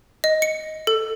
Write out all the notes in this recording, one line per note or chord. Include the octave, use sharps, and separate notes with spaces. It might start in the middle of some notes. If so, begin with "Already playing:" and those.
D#5
C#7
A4